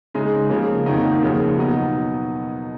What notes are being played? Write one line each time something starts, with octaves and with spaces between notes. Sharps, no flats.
C#3 G#3 D#4 G#4
C#3 F3 A#3
F2 D#3 A#3 D#4 F#4
D#2 C#3 F3
B2 F#3 B3 D#4